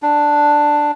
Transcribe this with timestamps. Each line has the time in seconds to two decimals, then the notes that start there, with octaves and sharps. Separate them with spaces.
0.02 D4